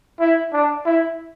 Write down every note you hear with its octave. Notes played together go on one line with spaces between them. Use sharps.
E4
D4
E4